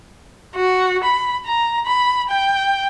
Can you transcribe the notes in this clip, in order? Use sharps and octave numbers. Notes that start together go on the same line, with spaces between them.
F#4
B5
A#5
B5
G5